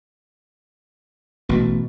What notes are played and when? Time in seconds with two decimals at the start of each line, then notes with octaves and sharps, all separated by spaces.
1.49 A1 B2 A3